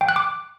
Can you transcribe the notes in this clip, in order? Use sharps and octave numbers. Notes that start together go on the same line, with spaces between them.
G5
F#6
D6